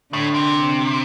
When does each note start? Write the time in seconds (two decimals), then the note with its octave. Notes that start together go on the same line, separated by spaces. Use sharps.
0.13 A2 D3
0.34 C3